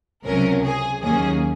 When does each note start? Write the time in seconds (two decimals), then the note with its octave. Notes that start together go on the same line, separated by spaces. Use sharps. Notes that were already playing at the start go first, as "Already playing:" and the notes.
0.24 C#2 C3 F#3 C#4 A#4
0.63 G#4
1.01 D#2 D#3 F#3 A#3 C#4 G#4